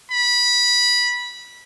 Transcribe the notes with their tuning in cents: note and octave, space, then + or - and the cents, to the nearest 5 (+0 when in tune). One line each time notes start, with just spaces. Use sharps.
B5 -15